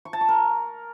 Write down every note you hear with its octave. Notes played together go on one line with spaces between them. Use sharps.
C#6
A5
C#6
A#4